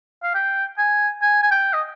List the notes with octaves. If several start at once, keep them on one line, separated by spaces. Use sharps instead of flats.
F5
G5
G#5
G#5
G#5
G5
D#5